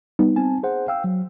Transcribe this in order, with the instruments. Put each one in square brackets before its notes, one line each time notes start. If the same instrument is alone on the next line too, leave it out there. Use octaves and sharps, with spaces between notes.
[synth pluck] G3 B3 D#4
[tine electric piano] C4 G#5 [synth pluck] A5
[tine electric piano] G#4 C5 F#5
F5 G5 E6
F#3